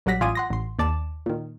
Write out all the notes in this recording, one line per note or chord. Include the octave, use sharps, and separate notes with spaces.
A#1 F#3 G3 F#5 A#6 B6
A1 F4 D5 G#5 D#6 D#7
F#5 C6 A#6
A1 C6
D#2 D5 A5 E7
A#2 D#3